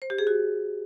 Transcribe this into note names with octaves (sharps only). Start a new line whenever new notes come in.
C5
G4
G#4
F#4